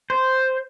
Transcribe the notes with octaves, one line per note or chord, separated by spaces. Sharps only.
C5